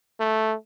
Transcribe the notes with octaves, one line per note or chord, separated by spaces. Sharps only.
A3